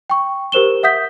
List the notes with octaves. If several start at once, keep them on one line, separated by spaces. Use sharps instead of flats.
G5 C#6
G4 A#4 C5 E7 G7
E5 F#5 D#6 G6 B6